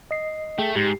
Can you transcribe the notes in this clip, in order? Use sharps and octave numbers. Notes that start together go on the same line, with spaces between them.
D#5 C7
A3 G#4 G5
G#2 G4 C7